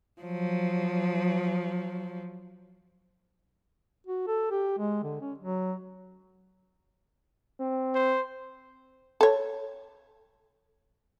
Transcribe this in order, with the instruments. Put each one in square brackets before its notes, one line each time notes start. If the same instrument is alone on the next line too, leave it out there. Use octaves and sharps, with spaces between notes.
[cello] F3 F#3
[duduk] F#4
A4
G4
G#3
D3
C#4
F#3
[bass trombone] C4
[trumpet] C5
[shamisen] A4 C#5